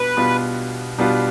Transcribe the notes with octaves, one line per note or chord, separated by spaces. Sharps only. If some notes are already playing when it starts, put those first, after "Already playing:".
Already playing: B2 G3 B3 D4 B4
B2 G3 B3 D4 F4
B2 G3 B3 D4 F4